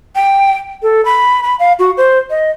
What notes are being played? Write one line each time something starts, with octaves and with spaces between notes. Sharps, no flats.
G5
A4
B5
B5
F5
F#4
C5
D#5